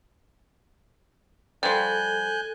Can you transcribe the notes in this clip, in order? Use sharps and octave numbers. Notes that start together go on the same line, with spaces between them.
F3 G3 A4 G#5 F#6 G6